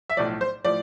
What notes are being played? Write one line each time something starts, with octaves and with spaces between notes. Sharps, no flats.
E5
B1 A2 F3 D5
C5
A2 F3 D5